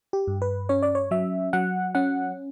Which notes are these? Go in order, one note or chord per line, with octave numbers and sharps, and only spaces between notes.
G4
G2
B4
C#4 C#5
D5
C#5
F#3 E5
F#3 F#5
C#4 F#5